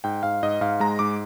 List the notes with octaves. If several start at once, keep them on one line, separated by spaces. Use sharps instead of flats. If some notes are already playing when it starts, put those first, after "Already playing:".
G#2 G5
G#2 F5
G#2 D#5
G#2 F5
G#3 A#5
G#2 D6